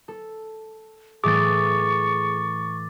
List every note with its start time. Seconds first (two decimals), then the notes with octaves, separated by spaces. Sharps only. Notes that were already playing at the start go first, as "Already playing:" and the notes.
0.08 A4
1.24 A2 E3 A3 G#4 C#6 D6 A6